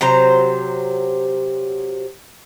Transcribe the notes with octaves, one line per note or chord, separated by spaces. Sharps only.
C3 F#3 C5 A#5